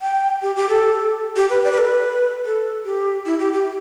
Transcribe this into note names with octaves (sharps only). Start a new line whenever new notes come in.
G5
G4
G4
A4
G4
B4
D5
B4
A4
B4
A4
G4
E4
G4
G4